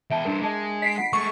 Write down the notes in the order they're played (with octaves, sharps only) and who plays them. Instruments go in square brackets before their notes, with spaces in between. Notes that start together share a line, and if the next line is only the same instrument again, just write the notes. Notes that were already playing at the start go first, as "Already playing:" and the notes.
[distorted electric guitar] E2 G5 [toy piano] E5 A5
[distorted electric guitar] G2 C5 [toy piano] D4 E4 A#4
[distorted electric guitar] G#3 [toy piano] D#5 A5 D6
[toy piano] D#5 [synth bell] B6 C7 D7
[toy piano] F4 F#5
[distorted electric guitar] G#3 A3 [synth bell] C#6